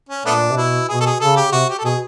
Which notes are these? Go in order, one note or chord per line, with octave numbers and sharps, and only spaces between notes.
C#4
A#2 A3 B3 D4
C3
B2 E4
B2 G#4
A4
G#4
C#3 A4
G4
C3 F#4
G4
A4
B2 G#4